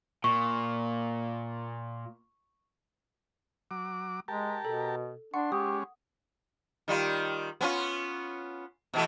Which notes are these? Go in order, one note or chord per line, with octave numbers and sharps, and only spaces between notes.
A#2 C#6
F#3 D6
G#3 G4 A#4 A5
B2 A4
D4 F#5 C6 C#6
G#3 C#4 G4 D#6
D#3 G3 F4
B3 C#4 F4
B2 E3 A3